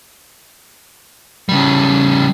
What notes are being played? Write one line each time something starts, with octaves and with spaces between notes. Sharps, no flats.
C#3 G3